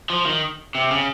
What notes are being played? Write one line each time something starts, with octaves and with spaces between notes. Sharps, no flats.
F3
D#3
C3
C#3